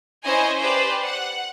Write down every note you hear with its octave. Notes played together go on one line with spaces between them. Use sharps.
C#4 E4 C5 D#5 G#5
G4 B4 C5 D5
F#5